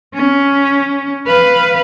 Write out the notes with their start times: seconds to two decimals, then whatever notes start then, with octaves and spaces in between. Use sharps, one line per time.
0.14 C#4
1.27 B4 F5